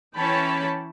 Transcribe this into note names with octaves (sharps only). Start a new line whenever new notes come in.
E3 C#4 C#5 G5 A5 B5